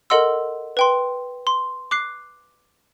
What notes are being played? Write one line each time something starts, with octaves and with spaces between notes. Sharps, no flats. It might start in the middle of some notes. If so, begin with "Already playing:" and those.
A4 A#4 D#5 F#5 C6 E6
B4 G5 C6
C6
D6 F#6 C7